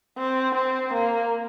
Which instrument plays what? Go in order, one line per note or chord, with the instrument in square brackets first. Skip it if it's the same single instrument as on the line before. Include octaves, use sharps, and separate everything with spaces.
[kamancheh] C4
C4
A#3